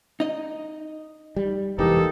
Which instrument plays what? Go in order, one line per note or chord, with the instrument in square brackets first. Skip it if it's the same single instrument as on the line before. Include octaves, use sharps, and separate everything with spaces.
[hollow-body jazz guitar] D#4 D#5
[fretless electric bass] G3
[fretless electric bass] F1 E2 G#2 [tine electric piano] E3 G4 [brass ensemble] A#3 D#4 A4